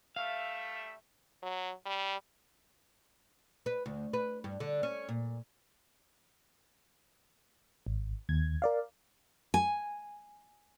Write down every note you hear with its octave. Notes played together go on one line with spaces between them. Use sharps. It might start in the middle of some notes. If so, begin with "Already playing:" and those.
G3 A3 E5 F5
F#3
G3
B4
D2
B4
G2
D3
C#4
A#2
G#1
D#2 G#6
A#4 D5 F5
G#5